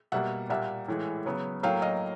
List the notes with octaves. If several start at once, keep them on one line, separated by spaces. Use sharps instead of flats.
B2 G3 A#3 E5 F#5
A#2 G3 A#3 E5 F#5
A2 E3 G#3
C#3 F#3 B3
A2 F#3 A#3 F5 G5
D#5 F5